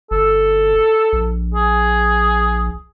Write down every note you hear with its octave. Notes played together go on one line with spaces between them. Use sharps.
G1 A4
A#1
G#4